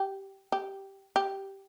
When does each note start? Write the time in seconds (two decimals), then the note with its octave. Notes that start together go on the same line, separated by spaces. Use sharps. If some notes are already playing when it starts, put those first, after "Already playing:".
Already playing: G4
0.52 G4
1.16 G4